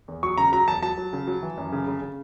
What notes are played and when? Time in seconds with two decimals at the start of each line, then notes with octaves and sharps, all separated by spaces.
0.08 E2
0.23 F#3 C#6
0.37 C#3 A#5
0.52 F#3 A#5
0.68 E2 A5
0.82 F#3 A5
0.97 F#3
1.13 C#3
1.27 F#3
1.42 E3
1.58 F#2
1.72 C#3
1.87 C#3
2.02 C#3